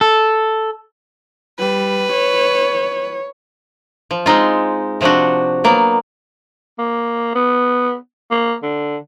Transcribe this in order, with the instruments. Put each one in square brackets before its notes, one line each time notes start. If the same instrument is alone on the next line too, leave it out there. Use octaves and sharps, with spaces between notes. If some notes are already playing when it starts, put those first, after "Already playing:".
[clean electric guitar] A4
[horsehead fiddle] G3 [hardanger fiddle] B4
[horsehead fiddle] C#5
[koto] F3
G#3 C4 D#4 F4
C3 F3 C4 D4 F#4
F#3 A#3 B3
[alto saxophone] A#3
B3
A#3
D3